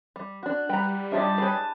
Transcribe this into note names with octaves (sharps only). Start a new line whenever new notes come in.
G3
D4 F#4 F#6
G3 B4 F#5 G5 A#5
D4 F4 G4 C#5 D#5 E5 A5
G#4 B4 C#5 G5 G#5